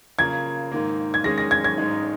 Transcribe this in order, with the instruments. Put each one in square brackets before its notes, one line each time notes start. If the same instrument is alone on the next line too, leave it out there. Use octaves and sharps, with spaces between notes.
[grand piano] C#3 A#3 F4 A#4 [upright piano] G#6
[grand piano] G#2 D#3 A#3
[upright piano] G#6
[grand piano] D#3 G#3 C#4 G#4 [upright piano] A#6
[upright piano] A#6
G#6
G#6
[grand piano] G#2 G#3 D#4